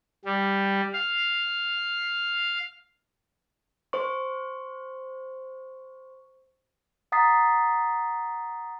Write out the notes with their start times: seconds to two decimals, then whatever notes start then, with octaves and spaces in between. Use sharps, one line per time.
0.25 G3
0.93 F5
3.93 C5 C#6
7.12 F#5 A#5 D#6 A6 B6 C7